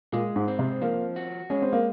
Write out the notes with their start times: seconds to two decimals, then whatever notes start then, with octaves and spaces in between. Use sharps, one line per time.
0.12 A#2 G#3
0.36 G#2
0.48 C4
0.59 C3
0.81 F3 A#3
1.16 F#4
1.50 G#3 C#4
1.62 C4
1.73 A#3